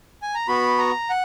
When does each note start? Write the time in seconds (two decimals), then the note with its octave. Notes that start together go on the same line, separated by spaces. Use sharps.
0.22 G#5
0.35 A#5
0.47 B3 F#4 B5
0.78 A#5
1.10 F#5